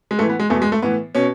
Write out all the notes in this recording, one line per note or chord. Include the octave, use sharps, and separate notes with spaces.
G#3
A2 E3 A3
B3
G#3
E2 B2 A3
G#3
A3
A2 E3 B3
B2 C#4